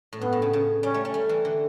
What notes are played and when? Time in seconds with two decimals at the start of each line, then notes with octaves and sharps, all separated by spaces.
0.13 A2
0.21 G2 B3
0.33 A2
0.42 C#3
0.53 C#3
0.83 G3 C#4
0.94 A3
1.05 A3
1.14 G3
1.29 E3
1.45 D3